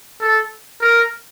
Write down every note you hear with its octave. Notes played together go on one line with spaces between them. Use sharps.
A4
A#4